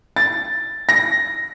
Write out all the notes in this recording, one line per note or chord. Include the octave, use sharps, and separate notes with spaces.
A6
A#6